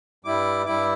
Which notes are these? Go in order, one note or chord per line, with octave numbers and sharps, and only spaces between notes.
G2 G3 E4 D6
G2 G3 E4 D6